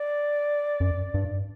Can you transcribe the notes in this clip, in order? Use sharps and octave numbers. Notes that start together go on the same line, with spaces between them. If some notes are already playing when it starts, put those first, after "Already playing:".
Already playing: D5
F#2
G2